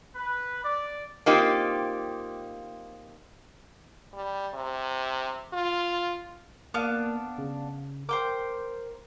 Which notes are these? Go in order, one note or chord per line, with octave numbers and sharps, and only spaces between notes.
B4
D5
A#3 C4 D#4 F4 G4
G3
C3
F4
A#3 B3 D4 D5 F5
C#3
A#4 C5 G5 D6